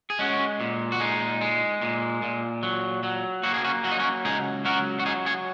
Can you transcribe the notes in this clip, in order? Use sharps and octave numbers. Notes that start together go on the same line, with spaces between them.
G#4
G#3 C#4 F#4
A#2
F#4
G#3 D#4
G#3
A#2
A#2
F#3
F#3
A#3 F#4
G#4
C#4 F#4
F#3 F#4
D#4
C#4 F#4
C#2 D#4 G#4
F#3 F#4 A#4
F#4
F#3 D#4 G#4
G#4 C#5